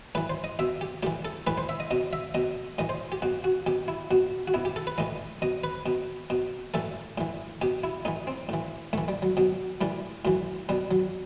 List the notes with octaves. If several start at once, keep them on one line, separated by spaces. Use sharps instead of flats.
A2 E3 B4
C5
D#5
B2 E5
G4
A2 E3 G4
A4
A2 E3 B4
C5
E5
D#5
B2 D#5
E5
B2 D#5
A2 E3 D#5
C5
G4
B2 F#4
F#4
B2 G4
E4
B2 F#4
F#4
B2 E4
G4
A4
B4
A2 E3 D#5
B2 D#5
B4
B2
B2
A2 E3 A4
A2 E3
B2 G4
E4
A2 E3 D#4
C4
A2 E3
A2 E3 A3
G3
F#3
B2 F#3
A2 E3 G3
A2 E3 F#3
B2 G3
F#3